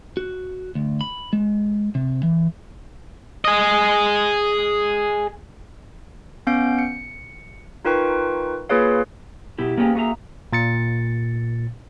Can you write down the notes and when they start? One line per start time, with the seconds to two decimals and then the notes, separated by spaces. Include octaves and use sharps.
0.17 F#4
0.75 D2
1.01 B5
1.33 G#3
1.95 C3
2.23 E3
3.45 G#4 D#5
6.47 B3 C#4 F5 G6 D7
6.79 C#7
7.85 D#4 F4 A#4 B4 G5 C#6
8.69 A#3 F4 G#4 B4 C#5 F5
9.58 B2 B3 E4 G4
9.78 A#3 B3 C#4 G4 G#4
9.95 A#3 F#4 G#4 E5 A#5
10.53 A#2 A6 C#7